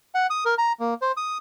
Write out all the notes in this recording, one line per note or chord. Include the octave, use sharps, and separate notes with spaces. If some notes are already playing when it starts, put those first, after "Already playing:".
F#5
D#6
A#4
A#5
A#3
C5
D#6